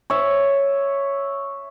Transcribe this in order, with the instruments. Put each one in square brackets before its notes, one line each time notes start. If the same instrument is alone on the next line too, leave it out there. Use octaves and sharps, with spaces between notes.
[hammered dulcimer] C#5 E5